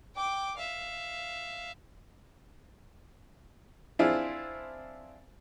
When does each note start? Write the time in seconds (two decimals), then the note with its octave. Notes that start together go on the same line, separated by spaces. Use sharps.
0.15 G5 D6
0.58 E5 F5
3.99 C4 D4 E4 F4 G#4